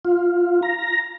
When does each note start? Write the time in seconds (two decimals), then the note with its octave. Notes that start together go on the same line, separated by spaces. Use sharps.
0.05 F4
0.62 A#5